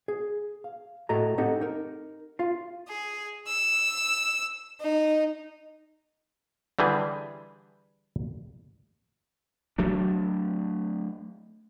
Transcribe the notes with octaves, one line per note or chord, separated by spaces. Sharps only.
G#4
F5
A2 F#4 A4 D#5 A#5
C4 D#4 G4 A4 D#5 F#5
D#4 A#4
F4 F5
G#4
E6
D#4
D3 E3 G3 G#4 B4
F#3 A3 D4